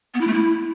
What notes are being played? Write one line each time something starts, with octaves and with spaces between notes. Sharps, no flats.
B3
E4
A3
E4